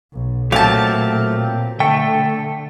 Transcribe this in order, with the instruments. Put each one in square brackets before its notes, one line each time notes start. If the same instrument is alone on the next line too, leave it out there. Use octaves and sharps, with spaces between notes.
[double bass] B1
[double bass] A#2 [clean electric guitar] F#3 A3 [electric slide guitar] C4 G4 [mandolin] F5 A5
[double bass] D3 [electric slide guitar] A3 [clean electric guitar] G5